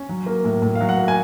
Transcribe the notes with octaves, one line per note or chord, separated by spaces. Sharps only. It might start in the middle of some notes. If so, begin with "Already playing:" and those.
Already playing: C#4
F#3
A#3
A2
A2
F5
F#3
F#5
A#3
G#5